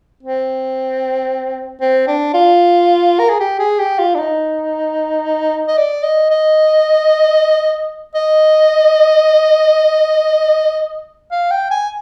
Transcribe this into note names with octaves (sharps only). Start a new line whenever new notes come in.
C4
C4
D4
F4
A#4
G#4
G4
G#4
G4
F4
D4
D#4
D#5
D5
D#5
D#5
D#5
F5
G5
G#5